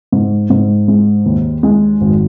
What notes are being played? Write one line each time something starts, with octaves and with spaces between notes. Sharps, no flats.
G#2
G#2
G#3
D#2
G#3
G#1